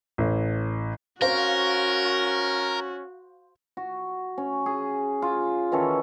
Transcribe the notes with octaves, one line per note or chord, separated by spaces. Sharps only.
A1
C#4 F#4 A#4 C5 F5
F#4
C#4
G#4
F4
D#3 E3 C#4 A4